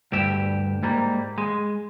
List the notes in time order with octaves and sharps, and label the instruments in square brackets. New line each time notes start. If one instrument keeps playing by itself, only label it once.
[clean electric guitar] D2 G2 G4 E5
G#2 G3 A#3
G#3